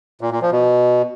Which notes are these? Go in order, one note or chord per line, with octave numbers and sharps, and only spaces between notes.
A#2
A#2
F3
B2